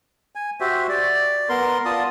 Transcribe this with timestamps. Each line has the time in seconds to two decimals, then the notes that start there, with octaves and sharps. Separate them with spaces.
0.35 G#5
0.60 F#4 G4 C5 E5
0.89 D5
1.49 B3 A#4 C6
1.85 F4 D5 A5 D#6